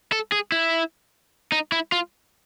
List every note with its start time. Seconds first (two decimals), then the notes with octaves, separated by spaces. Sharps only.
0.12 A4
0.32 G#4
0.52 E4
1.52 D#4
1.72 E4
1.92 F4